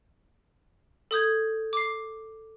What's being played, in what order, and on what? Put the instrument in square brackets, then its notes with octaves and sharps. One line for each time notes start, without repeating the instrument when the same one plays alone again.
[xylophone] A4 D#6 G6 G#6
D6 C7